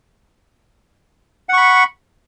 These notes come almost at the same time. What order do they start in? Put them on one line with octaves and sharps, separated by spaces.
F#5 C#6 B5